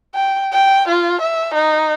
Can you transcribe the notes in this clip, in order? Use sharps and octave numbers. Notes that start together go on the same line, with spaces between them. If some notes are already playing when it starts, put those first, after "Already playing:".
G5
G5
F4
E5
D#4